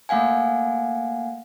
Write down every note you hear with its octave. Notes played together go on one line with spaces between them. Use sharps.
A3 A#3 F5 F#5 G#5